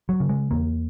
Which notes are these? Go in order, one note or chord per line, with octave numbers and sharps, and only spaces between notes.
F#3
C#3
G#3
E2 A#3